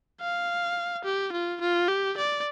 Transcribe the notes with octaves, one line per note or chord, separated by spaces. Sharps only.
F5
G4
F4
F4
G4
D5